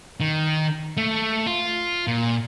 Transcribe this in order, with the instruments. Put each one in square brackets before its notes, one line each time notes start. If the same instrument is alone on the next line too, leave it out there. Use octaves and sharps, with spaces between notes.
[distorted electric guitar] D#3
A3
F4
A#2